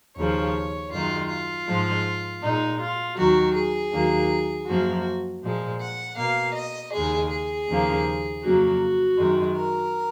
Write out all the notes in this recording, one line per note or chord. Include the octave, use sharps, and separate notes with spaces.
D#2 C#3 F3 C#5
F#2 D#3 G#3 F4
F4
G#2 F3 G#3
A#2 D#4
G#3
F4
D#2 D#3 F#3 F#4
G#4
D#2 D#3 F#3 A#3
F#2 F3 A#3 F#4
A#2 F3 G#3
F#5
B2 A#3 F5
D#5
D#2 C#3 G#3 G#4
G#4
D#2 C#3 F3 A#3
F2 C#3 F#3 A#3 F#4
F#2 D#3 G#3
A#4